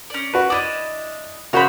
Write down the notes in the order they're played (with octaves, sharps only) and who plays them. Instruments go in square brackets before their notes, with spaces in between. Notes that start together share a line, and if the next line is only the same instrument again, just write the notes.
[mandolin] C#4 D5
[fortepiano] F#4 B4
[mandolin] D4 E4 D#5 [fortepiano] D6
[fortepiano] C#3 F#4 [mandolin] A#4 C5 B5